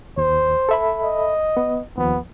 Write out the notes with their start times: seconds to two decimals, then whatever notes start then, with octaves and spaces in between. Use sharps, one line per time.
0.17 D#2 C5
0.69 A4 E5 B5
1.04 D#5
1.57 B3
1.98 D#2 F3 B3